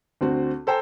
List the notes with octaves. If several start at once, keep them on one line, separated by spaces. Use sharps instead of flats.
D2 C4 F#4
A4 C5 G5 G#5 A#5